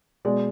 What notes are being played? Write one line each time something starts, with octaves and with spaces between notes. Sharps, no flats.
B2 G#3 D5